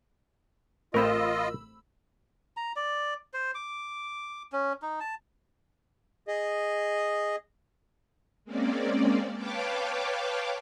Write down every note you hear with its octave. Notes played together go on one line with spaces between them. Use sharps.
A1 A3 C4 F4 A#4 D#5 B5 E6
A#5
D5
C5
D6
C#4
D#4
A5
G#4 D#5
G#3 A#3 C4 C#4 D5
B4 C#5 F5 G5 A5 D6